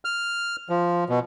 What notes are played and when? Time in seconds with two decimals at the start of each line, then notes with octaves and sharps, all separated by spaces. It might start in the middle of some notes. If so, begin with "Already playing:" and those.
0.05 F6
0.69 F3
1.09 B2